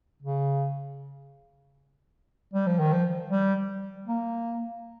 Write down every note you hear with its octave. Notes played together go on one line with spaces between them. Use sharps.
C#3
G3
F3
D#3
F3
G3
A#3